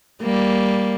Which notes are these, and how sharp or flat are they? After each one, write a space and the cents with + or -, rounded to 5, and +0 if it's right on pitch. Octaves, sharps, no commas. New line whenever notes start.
G3 +0 A#3 +0